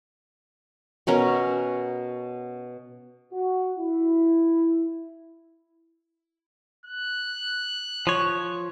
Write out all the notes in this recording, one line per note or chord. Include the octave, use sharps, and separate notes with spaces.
B2 C#4 A#4 A#5
F#4
E4
F#6
F3 C#5